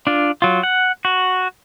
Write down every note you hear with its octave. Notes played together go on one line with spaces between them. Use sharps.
D4 F4
F#3 F4
F#5
F#4